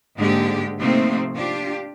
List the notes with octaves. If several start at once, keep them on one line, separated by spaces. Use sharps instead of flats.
G#2 D3 G#3 A#3 G4
C3 F3 A3 A#3 C4 D#4
D4 F4 G4